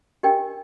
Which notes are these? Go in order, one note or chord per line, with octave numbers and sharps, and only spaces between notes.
D4 G4 A#4 D#5 G5